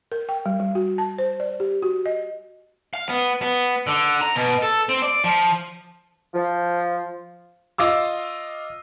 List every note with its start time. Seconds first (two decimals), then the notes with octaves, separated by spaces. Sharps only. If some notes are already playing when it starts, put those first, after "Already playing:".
0.12 A#4
0.29 G5
0.46 G3
0.60 G3
0.75 F#4
0.98 A5
1.18 C5
1.40 D5
1.60 G4
1.82 F#4
2.06 D#5
2.94 F5
3.09 B3
3.42 B3
3.87 D3
4.21 A#5
4.35 B2
4.62 A4
4.89 C4
5.02 D5
5.24 F3
6.34 F3
7.78 F4 D#5 F5 D6 E6